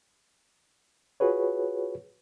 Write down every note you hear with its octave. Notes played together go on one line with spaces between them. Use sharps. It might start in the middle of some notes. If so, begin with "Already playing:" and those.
F4 F#4 G#4 B4 C#5